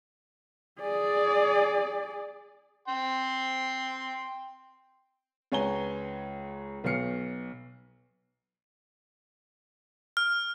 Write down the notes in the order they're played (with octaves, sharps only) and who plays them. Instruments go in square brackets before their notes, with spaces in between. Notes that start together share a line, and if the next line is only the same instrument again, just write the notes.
[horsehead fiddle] G#4 D5
[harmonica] G5 C6
[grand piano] C#2 B4 C#5 G#5 A#5 G7
B1 B3 C#5 F6 C7 C#7
[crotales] F6